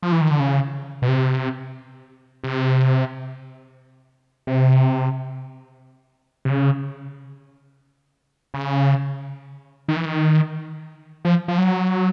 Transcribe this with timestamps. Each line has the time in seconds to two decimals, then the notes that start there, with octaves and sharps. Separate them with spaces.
0.03 F3
0.12 E3
0.21 D#3
0.31 D3
0.40 C#3
1.02 B2
1.08 C3
2.44 C3
4.47 C3
6.45 C3
6.50 C#3
8.54 C#3
9.88 D#3
9.97 E3
10.05 D#3
11.25 F3
11.48 F3
11.58 F#3